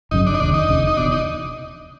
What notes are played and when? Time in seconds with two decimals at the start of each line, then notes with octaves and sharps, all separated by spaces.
0.11 G1 F#2 C#3 D#4
0.27 D4
0.34 D#4
0.40 F1 D#2 C#3 D4
0.54 D#4
0.69 F1 D#2 C#3
0.87 D#4
0.97 F1 E2 B2 D4
1.11 D#4